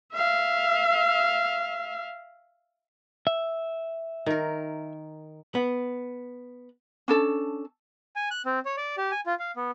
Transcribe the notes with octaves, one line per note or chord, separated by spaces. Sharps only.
E5 F5
E5
D#3 A#4
B3
C#4 D4 A4 A5
G#5
F#6
C4
C#5
D5
G4
G#5
F4
F5
B3